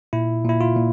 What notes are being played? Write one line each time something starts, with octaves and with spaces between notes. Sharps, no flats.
A#2 E4
A#2 E4
F4
A#2